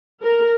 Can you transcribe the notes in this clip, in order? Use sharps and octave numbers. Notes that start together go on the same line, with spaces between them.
A#4